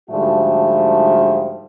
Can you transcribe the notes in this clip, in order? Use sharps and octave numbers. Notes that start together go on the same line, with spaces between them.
G#2 D3 F3 G3 A3 F#4